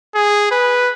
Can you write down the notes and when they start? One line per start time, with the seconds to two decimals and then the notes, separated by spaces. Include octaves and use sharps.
0.15 G#4
0.51 B4